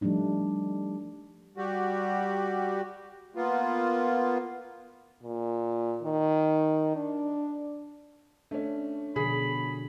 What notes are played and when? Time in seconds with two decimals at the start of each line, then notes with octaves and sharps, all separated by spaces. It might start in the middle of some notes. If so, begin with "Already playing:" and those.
0.01 F3 G3 A3 D4 D#4
1.57 G3 F#4 G4
3.36 A#3 B3 F4
5.23 A#2
6.03 D#3
6.96 D4
8.51 A3 C#4 D4
9.16 B2 D3 F3 G#4 B5